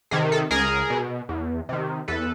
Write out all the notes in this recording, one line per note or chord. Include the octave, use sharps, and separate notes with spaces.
C3 D#3 G#4
A4
C#2 G#4 A#4
B2
E2
C3 D#3
E2 A4 B4